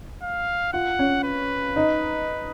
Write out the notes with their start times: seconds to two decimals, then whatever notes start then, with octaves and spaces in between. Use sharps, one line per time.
0.22 F5
0.73 F4 F#5
0.99 C#4
1.24 B4
1.76 D#4